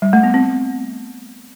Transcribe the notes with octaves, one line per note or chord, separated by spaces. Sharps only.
G3
A3
B3
C4